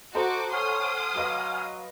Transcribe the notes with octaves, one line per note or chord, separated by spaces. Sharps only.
F#4 A4 C5 D#5 A#5 D6
C#5 F#5 G#5 C6 D#6 F6
F#3 B4 D#5 F5